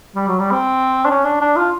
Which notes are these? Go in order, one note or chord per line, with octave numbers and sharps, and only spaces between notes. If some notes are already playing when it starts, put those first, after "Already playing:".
G3
F#3
G3
C4
D4
C#4
D4
D4
F4